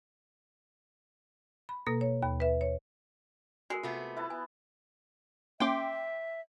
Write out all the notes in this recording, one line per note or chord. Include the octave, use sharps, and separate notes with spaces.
B5
B2 A#3 A4 A#6
C#5
D#2 B5
B4 E5
C#5
G#3 F#4 A#4
C3 A3 B3 F4
E4 B4 E5 A5
B3 G#5
A#3 C#4 E5 G5 C6 D6